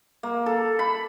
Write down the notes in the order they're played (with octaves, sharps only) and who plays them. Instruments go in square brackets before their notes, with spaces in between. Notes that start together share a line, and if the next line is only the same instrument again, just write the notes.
[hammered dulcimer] A#3
A4
B5